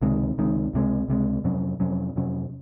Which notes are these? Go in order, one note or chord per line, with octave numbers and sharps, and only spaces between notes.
C#2 C3 D#3 G#3
C#2 C3 D#3 G#3
C#2 C3 D#3 G#3
C#2 C3 D#3 G#3
F2 C3 F#3 C#4
F2 C3 F#3 C#4
F2 C3 F#3 C#4